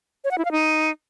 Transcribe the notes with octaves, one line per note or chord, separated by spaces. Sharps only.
C#5
F#5
E4
F5
D#4